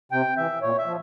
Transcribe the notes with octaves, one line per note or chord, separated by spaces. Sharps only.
C3 G5
E3 E5
A#2 C#5
E5
F3